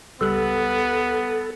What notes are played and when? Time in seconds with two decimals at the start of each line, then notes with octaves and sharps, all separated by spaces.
0.21 C#2 G3 B3 A4 F#6